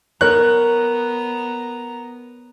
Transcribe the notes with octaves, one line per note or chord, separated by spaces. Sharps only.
B3 A#4 C#5 A#5 F#6